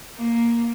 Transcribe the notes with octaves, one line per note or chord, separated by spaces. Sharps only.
A#3